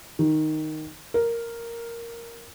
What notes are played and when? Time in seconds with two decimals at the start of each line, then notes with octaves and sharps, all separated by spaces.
0.19 D#3
1.14 A#4